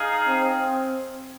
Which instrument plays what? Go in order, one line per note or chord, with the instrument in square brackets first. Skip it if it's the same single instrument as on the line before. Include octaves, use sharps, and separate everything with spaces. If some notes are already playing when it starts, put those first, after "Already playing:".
Already playing: [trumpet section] D#4 G#4 F5
[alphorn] C4